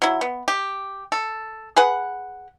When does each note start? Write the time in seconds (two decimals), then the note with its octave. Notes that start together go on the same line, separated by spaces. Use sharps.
0.02 F#3 E4
0.21 B3
0.48 G4
1.12 A4
1.76 G#4 B4 F#5